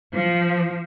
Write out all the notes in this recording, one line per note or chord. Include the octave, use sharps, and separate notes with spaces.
F3